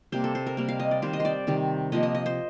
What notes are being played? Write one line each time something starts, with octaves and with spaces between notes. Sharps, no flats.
C3 G3 A#3 C5
A4
C5
A#4
C3 G3 A#3
F5
D#5
D5
C3 D#3 G3 C5
D#5
C5 D5
C3 D#3 G3
C3 F3 A#3 D#5
D#5
D#5
C5